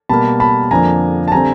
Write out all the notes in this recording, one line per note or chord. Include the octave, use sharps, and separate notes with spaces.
B2 G3 A#3 A5 B5
A5 B5
F2 D3 F3 A#3 D4 G#5 A#5
A5
D3 G3 C4 G#5 A#5